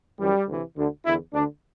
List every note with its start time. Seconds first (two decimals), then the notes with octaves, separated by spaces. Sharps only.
0.18 F#2 E3 G3
0.47 D2 C3 E3
0.76 D2 D3
1.05 E2 D3 E4
1.33 D2 D3 D4